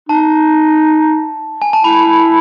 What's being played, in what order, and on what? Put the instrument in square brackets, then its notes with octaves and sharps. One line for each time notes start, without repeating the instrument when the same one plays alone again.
[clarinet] D#4 [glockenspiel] A5
[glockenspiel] G#5
A5
[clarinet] E4 [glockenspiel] B5